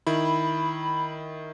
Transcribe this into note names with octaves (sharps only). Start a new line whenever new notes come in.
D#3 E4 B5